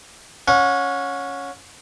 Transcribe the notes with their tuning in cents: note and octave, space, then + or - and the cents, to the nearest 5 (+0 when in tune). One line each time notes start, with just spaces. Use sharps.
C#4 +0 F#5 -35